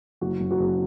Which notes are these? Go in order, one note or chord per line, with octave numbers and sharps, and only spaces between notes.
F#1 F#3 F#4
F#2
F#3 F#4
F#1